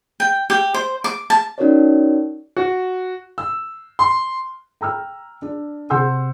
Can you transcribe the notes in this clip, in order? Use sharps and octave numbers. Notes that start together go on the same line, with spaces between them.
G5
G4
C5
D6
A5
C#4 D#4 F#4 A#4 C#5 D5
F#4
E6
C6
G5 A#5 E6 F6
D4
C3 F#5 C6 E6 G6